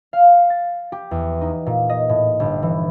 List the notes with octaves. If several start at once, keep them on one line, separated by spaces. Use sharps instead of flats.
F5
A6
G4
E2
D#4
A#2
D#5
A2
G1
E3